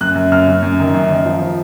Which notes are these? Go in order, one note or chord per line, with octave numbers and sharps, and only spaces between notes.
F#2 F#6
F#2
F#2 F6
F#2
F#2
D#3
F#2
D#3
F3
F3